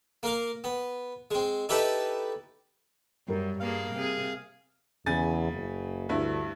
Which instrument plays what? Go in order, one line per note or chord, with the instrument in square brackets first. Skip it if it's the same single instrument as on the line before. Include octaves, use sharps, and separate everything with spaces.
[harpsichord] A#3 A#4 F5
B3
G#3 C4
D#4 E4 G4 A4 B4
[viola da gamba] F#2 [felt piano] G3 A#4
[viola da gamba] G2 A#3 G#4 [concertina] F5
[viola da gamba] C3 G#4
[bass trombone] E2 [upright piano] C#3 G#5 A6
[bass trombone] F#1
[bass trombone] D2 [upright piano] G2 E4